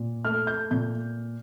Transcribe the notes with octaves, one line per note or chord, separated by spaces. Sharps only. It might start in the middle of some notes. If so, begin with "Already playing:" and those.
Already playing: A#2
A3 F6
G6
A#2 G6